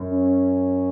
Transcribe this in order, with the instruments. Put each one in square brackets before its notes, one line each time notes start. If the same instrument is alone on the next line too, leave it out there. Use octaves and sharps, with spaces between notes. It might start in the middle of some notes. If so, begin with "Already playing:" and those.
Already playing: [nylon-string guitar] F#2
[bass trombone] C#4